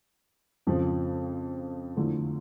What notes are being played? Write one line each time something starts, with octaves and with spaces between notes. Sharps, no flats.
F2 C#3 F3
E2 D3 F3 A3